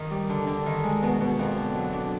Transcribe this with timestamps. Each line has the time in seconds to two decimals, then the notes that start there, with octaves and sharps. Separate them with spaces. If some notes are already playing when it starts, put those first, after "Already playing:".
Already playing: D#3
0.11 G3
0.29 D3
0.47 D3
0.66 D#3
0.84 G#3
1.02 B2
1.20 B2
1.39 F2
1.57 D3
1.75 F#3
1.93 D4